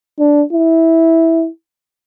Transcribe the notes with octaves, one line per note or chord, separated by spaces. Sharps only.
D4
E4